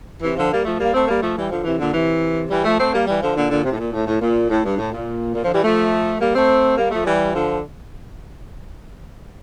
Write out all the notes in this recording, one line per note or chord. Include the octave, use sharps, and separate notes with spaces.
C3 E3
D3 F3
G3 A#3
F3 A3
G3 A#3
A3 C4
G3 A#3
F3 A3
E3 G3
D3 F3
C3 E3
A#2 D3
C3 E3
E3 G3
F3 A3
A3 C4
G3 A#3
E3 G3
D3 F3
A#2 D3
A#2 D3
C3
A2
A#2
A2
A2
A#2
A2
G2
A2
A#2
A#2
D3 F3
E3 G3
F3 A3
G3 A#3
A3 C4
G3 A#3
F3 A3
E3 G3
D3 F3